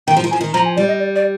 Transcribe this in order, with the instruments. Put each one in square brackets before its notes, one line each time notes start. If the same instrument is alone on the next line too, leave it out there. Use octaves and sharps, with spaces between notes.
[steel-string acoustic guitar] D#3 [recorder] G5
[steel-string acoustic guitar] F3
D#3
[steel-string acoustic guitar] F3 [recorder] G#5
[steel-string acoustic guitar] D#3
[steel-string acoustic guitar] F3 [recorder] A#5
[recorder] G#5
[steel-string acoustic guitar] G3 [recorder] D5
[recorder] D#5
D5
D5